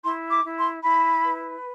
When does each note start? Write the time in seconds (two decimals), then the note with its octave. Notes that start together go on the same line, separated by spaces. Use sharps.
0.03 E4 C6
0.31 D6
0.44 E4
0.57 C6
0.83 E4 B5
1.24 B4